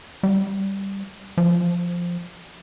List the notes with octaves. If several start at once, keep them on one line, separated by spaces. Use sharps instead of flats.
G3
F3